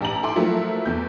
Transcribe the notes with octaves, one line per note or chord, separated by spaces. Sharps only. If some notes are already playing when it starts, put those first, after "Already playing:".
A1 G4 A5 A#5 F#7
E4 A4 G5 G#5 C6 D6
F3 F#3 A3 A#3 E4 F4
E2 G6